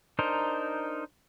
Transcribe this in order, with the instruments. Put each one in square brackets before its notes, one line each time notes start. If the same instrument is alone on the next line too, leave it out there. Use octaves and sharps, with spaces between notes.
[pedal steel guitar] D4 D#4 A#4 C5